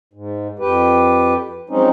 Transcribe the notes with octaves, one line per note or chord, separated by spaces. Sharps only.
G#2
F2 G4 B4
F3 F#3 G#3 C4 C#4 D#4